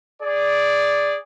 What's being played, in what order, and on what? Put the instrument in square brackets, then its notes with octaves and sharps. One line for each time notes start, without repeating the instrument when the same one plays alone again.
[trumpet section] G#4 D5